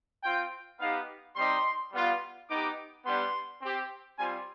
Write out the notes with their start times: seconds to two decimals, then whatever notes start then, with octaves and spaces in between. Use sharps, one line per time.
0.23 C4 F4 G5
0.79 B3 D#4 G4 F5
1.36 G3 C4 D#4 G4 C6
1.92 G3 B3 F4
2.49 B3 D#4 G4 D6
3.05 G3 B3 D4 G4 C6
3.62 C4 G4
4.18 G3 C4 F4 G#5